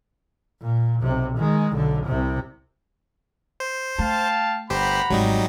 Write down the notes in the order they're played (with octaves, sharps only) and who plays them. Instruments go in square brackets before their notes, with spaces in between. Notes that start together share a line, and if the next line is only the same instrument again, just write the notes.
[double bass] A#2
B1 C3
D#3 G#3
B1 D3
C2 C3
[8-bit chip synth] C5
[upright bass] A3 [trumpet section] F5 G5 A5
[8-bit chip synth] G1 G4 C5 [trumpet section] F#5 A#5 B5
[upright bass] G#1 [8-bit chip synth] F#3 G3 D#4